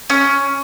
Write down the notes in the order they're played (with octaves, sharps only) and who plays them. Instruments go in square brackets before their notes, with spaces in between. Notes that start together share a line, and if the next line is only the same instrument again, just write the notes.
[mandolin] C#4